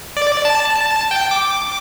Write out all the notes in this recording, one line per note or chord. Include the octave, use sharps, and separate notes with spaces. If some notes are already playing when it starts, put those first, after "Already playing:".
D5
A5
G5
D6